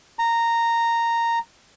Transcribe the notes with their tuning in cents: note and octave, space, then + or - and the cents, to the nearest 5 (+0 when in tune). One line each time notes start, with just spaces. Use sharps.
A#5 -10